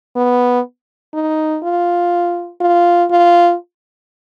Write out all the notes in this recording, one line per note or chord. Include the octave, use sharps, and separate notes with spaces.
B3
D#4
F4
F4
F4